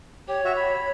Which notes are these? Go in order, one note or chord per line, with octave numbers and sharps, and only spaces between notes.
G4 C#5
F#4 E5
B5